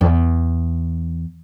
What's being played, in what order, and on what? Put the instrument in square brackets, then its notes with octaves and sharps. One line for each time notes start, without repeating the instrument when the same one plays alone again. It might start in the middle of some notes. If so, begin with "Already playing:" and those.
[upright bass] E2